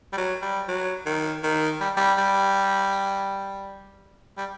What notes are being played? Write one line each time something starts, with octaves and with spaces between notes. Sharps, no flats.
G3
F#3
G3
F#3
D#3
D#3
G3
G3
G3
G3